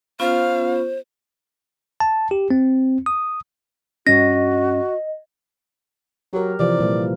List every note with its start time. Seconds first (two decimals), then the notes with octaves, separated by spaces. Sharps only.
0.20 B3 C#4 F4 C5 F5
2.00 A5
2.31 G4
2.51 C4
3.06 D#6
4.07 G2 C#4 F#4 D#5 A#6
6.33 F#3 G4 A#4
6.60 C3 E3 F3 D5
6.80 A#2 G3 A#3